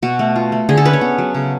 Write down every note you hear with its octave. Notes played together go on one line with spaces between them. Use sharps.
B2 F#4
A3
F4
A3
D3 G#4
A4
C#4 B4
C#5
B3
F#3
C#3